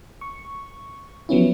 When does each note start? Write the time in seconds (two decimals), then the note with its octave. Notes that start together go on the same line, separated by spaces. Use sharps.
0.21 C#6
1.29 F3 F#3 B3 C#4 E4